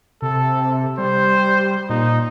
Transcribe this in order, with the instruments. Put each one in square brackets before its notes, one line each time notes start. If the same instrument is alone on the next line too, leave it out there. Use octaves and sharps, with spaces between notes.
[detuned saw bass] C3 [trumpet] A4
[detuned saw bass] G3 [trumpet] C5
[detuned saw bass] A#2 [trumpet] D#4